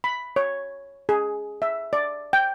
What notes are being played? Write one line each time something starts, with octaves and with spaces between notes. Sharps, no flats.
B5
C#5
G#4
E5
D5
G5